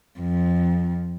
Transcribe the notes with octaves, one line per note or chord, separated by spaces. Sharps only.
F2